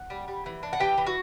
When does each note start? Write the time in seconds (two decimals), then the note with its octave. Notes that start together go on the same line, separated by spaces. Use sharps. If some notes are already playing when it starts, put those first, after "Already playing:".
Already playing: F#5
0.10 G3
0.28 G3
0.46 E3
0.63 D4
0.73 F#5
0.80 E3 G4 G5
0.98 E3
1.07 F#4